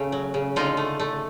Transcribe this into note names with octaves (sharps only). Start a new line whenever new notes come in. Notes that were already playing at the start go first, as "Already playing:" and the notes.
Already playing: C#3 A3
F#3
C#3
D3 D#4 F4
A3
A3